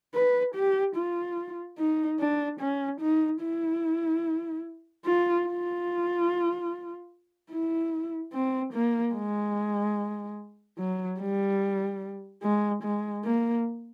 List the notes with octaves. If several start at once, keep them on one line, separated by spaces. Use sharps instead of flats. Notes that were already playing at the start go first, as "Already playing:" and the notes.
B4
G4
F4
D#4
D4
C#4
D#4
E4
F4
F4
E4
C4
A#3
G#3
F#3
G3
G#3
G#3
A#3